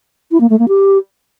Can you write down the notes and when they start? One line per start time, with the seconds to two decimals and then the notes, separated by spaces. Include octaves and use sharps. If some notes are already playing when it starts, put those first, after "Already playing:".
0.31 E4
0.41 A#3
0.50 A3
0.59 A#3
0.68 G4